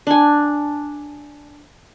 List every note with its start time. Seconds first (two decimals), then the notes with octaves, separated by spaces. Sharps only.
0.07 D4 G#5